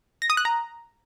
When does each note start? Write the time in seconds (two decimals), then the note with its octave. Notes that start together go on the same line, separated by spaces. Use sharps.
0.22 A#6
0.30 D#6
0.37 F#6
0.45 A#5